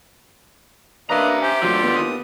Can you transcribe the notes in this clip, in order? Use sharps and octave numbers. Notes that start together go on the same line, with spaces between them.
A#3 D4 B4 D#5 E5 A#5
G4 C5 G#5
D3 F#3 A3 F4
B3
D#2 D#6